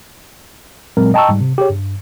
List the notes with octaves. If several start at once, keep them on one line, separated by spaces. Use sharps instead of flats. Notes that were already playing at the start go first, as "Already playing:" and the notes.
A#2 F#3 G#3 C4 A#4
D#5 G5 A5 A#5 C#6 E6
G#2 G3
C3
G4 G#4 C#5
G2